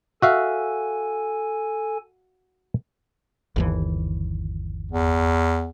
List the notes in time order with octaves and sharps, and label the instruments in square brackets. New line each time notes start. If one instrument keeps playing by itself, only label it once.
[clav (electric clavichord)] F#4 E5 F5 [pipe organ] A4 G#5
[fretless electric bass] G1 D#2 E3
[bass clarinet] E2